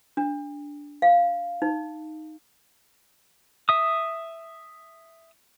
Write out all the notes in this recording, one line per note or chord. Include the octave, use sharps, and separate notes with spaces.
D4
F5
D#4
E5 D#6